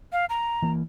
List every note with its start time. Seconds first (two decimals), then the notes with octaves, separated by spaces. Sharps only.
0.12 F5
0.29 A#5
0.62 E3 A#3